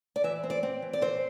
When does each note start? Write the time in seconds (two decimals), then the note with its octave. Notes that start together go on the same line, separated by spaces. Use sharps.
0.16 D5
0.24 E3 E5
0.43 C4
0.50 D5
0.63 C4
0.82 E3
0.93 D5
1.02 C4 C5